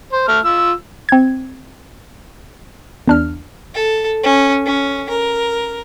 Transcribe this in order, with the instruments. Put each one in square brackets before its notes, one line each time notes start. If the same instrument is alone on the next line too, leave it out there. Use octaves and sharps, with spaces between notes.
[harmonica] C5
A3 F6
F4 E6
[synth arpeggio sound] C4 G#6
E2 D4 F6
[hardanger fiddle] A4
C#4
C#4
A#4